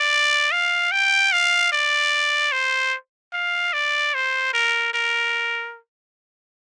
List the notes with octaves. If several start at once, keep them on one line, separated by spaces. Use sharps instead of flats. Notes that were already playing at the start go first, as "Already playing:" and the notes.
Already playing: D5
F5
G5
F5
D5
C5
F5
D5
C5
A#4
A#4